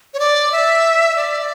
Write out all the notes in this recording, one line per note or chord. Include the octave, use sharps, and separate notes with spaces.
C#5
D5
E5
D5